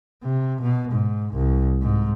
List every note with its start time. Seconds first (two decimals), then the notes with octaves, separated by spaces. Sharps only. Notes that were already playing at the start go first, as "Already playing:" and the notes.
0.23 C3
0.62 B2
0.92 G#2
1.34 C2
1.82 G#2